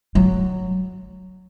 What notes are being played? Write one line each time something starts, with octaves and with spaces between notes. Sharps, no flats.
F#3